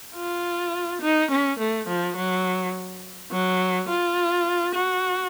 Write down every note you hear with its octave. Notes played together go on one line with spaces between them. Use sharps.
F4
D#4
C#4
A3
F3
F#3
F#3
F4
F#4